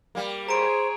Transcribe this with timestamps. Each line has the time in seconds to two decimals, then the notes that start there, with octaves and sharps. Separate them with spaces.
0.15 G3 A#3
0.49 G#4 C5 C#5 A#5 D7